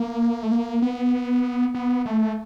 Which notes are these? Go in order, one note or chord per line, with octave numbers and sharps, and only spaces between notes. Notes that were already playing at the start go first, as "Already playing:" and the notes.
Already playing: A#3
A3
A#3
B3
B3
A3